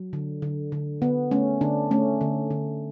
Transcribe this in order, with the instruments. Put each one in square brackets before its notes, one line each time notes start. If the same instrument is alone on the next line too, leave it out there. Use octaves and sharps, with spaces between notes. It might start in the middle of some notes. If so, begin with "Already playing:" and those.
Already playing: [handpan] F#3
D3
D3
D3
D3 B3
A3 C#4
D3 D4
A3 C#4
D3
D3